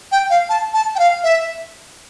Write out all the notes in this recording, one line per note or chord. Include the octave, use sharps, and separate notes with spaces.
G5
F5
A5
A5
G5
F5
E5